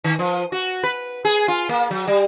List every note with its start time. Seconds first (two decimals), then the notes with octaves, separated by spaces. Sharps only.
0.04 D#3
0.19 F3
0.52 F#4
0.83 B4
1.25 G#4
1.48 F4
1.69 A#3
1.91 F#3
2.07 G3